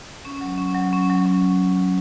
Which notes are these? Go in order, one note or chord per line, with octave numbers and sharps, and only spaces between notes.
C#4
F#3
C#4
F#3
C#4
F#3
C#4